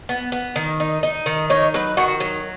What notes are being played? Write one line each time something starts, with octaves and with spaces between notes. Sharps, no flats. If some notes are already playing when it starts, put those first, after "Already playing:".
B3
B3
D#3
D#4
D#4
D#3
D#4 C#5
F#3 B4
D#3 F#4
F#3